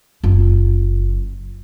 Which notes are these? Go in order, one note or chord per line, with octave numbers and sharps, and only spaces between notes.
F#1 F4